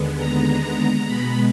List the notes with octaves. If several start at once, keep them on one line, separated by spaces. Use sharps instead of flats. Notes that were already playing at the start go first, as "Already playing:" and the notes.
Already playing: D#2 D3 G#3 B3
A#5
B2 G#3 B3 B5